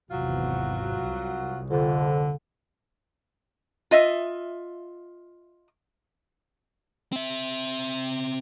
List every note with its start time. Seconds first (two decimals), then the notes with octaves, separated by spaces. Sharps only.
0.11 G#1 E2 C3 F#3 F4 F#4
1.02 C2
1.70 F2 D3
3.91 F4 D#5 E5
7.12 C4 E5